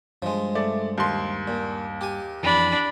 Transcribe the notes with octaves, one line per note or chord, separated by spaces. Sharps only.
G2 F3 G#3
A3 D5
D#2 C6
A#2
G4 G#5
F2 E3 D4 B5